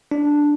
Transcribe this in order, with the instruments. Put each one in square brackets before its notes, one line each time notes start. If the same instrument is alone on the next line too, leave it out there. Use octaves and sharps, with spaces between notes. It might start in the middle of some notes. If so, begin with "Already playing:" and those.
[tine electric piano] D4